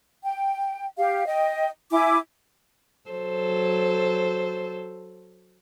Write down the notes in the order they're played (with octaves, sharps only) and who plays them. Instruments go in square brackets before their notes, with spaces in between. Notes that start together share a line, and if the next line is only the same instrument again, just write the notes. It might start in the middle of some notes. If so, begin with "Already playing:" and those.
[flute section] G5
G4 F5
D#5 G5
E4 G#5 D6
[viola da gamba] F#3 A4 C5